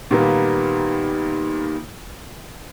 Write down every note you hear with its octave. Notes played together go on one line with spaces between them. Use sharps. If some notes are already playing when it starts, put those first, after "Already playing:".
A#2 D#3 G3 A#3 B3